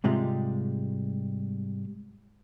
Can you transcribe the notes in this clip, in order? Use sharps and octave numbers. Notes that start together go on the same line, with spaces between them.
G#2 C3 G3 G#3 F4